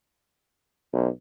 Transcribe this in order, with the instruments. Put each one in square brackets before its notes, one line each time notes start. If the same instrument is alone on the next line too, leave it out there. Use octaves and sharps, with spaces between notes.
[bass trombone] B1